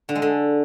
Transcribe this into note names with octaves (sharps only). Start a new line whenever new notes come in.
D3
G#3
D3